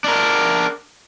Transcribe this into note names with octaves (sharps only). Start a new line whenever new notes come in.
D4 A#4